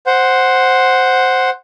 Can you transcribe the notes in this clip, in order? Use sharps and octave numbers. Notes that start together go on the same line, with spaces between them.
C5 F#5